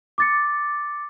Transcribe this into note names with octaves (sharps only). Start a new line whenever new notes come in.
D6 A6 C#7